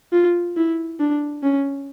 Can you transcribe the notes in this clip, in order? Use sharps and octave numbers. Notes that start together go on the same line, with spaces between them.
F4
E4
D4
C#4